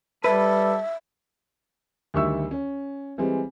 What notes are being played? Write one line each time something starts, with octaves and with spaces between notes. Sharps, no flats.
G3 A4 B4 E5
D2 D#3 G3 E5 C#6 E6
C#4
E3 G3 G#3 C4